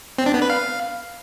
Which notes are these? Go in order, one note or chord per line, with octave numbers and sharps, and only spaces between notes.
C4
D4
B3
B4
F5